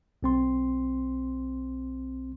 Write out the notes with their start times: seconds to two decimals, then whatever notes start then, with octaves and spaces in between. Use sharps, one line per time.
0.23 B1 C4 C6